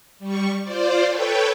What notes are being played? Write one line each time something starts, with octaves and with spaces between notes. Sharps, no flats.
G3 C#6
F4 C5 D5
A4 B4 C#5 G5